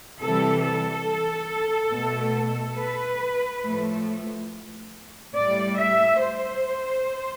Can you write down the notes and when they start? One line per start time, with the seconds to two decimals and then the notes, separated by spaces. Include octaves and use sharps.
0.21 C3 E3 G3 A4
0.64 A4
1.93 B2 A3
2.79 B4
3.64 A2 F3 A3
5.36 A2 G3 D5
5.79 E5
6.22 C5